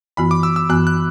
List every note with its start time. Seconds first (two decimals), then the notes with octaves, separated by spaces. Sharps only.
0.17 F#2 E3 B3 F#4 B5
0.31 D6
0.43 E6
0.56 E6
0.69 F#2 E3 B3 F#4 F#6
0.87 F#6